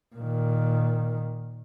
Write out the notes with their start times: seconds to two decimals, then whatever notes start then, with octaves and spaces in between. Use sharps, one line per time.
0.16 A#2 D#3